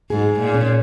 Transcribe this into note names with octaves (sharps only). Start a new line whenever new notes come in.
G#2 G#4
A#2
C#4